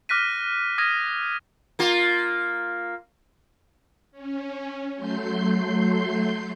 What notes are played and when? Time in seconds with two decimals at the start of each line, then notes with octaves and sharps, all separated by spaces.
0.09 D6 F6 F#6 A#6 B6 D#7
0.78 D#6 F6 G#6 A#6 B6 D#7
1.79 A#3 F4
4.12 C#4
4.95 F#3 A3 C6 G6 C7